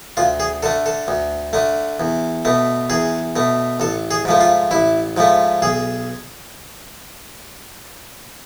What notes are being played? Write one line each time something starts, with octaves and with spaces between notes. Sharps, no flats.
D2 F4
G#4
D3 A3 A4
A4
D2
D3 A3
E2
B2 A3
E2 G#4
B2 A3
A1 A4
G#4
G#2 F3 A3
F4
A1 E4
G#2 F3 A3
B1 G#4